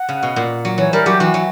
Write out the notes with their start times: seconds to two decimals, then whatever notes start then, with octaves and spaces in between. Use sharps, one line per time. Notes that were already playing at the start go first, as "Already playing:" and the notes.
Already playing: F#5
0.09 C#3
0.23 B2
0.36 A#2
0.65 F#3
0.78 E3 C#5
0.93 G3 A#4
1.06 F#3 G4
1.20 E3 F#4
1.34 F#3